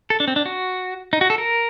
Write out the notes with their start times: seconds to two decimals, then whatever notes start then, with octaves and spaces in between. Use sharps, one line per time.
0.10 A4
0.20 D4
0.28 C4
0.36 D4
0.46 F#4
1.13 D#4
1.21 F#4
1.30 A4
1.38 A#4